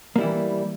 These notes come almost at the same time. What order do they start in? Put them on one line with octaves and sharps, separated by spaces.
A#3 G3 E4 E3